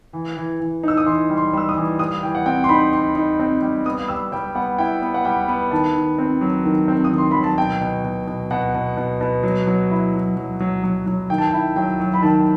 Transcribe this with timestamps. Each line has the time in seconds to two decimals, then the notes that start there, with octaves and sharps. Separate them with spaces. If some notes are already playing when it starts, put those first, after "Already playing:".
0.13 E3
0.37 E3
0.60 E3
0.83 D#4 E6
0.97 D#6
1.06 E3 C6
1.30 G3
1.37 C6
1.53 G3 E6
1.69 D#6
1.76 E3
1.99 G3 D#6
2.23 E3 G5
2.35 F#5
2.46 C4 G5
2.64 C6
2.69 D#4 B5
2.93 G3 C6
3.16 D#4
3.40 C4
3.62 G3
3.86 B3 D#6
4.08 G3 E6
4.32 G3 G5
4.55 B3 F#5
4.78 E4 G5
5.02 B3
5.14 F#5
5.25 G3 G5
5.48 B3
5.71 D#3 A5
5.95 D#3
6.18 C4
6.41 F#3
6.64 D#3
6.88 C4
7.04 D#6
7.12 D#3
7.18 C6
7.31 F#3 B5
7.44 A5
7.58 B2 G5
7.81 B2
8.04 B2
8.27 B2
8.51 B2 F#5
8.74 B2
8.97 B2
9.21 B2
9.43 F#3
9.67 F#3
9.91 E4
10.14 F#3
10.37 F#3
10.60 F#3
10.84 F#3
11.06 F#3
11.30 D#3 G5
11.38 A5
11.47 G5
11.53 E4
11.76 F#3 G5
12.00 F#3
12.14 B5
12.22 D#3 A5